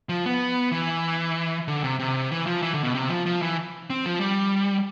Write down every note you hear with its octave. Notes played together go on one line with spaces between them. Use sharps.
F3
B3
E3
D3
C3
C3
E3
F3
E3
D3
B2
C3
F3
F3
E3
C4
F3
G3